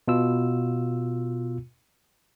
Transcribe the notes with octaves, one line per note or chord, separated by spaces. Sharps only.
B2 F4 E6